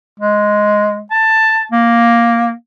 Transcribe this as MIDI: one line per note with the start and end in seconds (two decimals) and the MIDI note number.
0.20 1.03 56
1.11 1.66 81
1.72 2.52 58